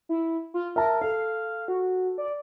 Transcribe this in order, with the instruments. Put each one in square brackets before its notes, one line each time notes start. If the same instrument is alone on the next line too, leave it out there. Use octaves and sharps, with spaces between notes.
[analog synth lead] E4
F4
[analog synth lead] A#4 [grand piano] E5 A5
[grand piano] A4 [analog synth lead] F5
[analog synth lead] F#4
D5